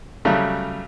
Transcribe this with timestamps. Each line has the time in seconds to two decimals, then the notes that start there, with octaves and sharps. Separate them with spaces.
0.25 C#3 F#3 G3 A3